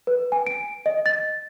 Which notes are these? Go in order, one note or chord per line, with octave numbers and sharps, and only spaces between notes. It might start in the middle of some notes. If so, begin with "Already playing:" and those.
B4
G#5
D7
D#5
A6